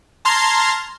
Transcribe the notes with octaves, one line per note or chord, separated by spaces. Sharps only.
A5 A#5 C6 F6 G#6